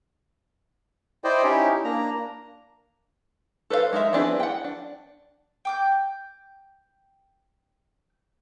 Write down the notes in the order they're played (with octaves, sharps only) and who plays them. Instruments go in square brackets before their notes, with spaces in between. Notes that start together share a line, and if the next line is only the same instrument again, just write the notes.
[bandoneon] E4 C5 D5 D#5 G5
C#4 D#4 E4 G4
A#3 D4 A#5
[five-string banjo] A4 B4 C5 D5 F5
G#3 D#4 A#4 C5 E5
B3 C4 D4 E4 G#4
F#5 G5
D4
[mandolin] G5 D6 G6